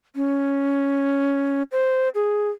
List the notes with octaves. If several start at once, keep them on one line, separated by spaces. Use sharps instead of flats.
C#4
C5
G#4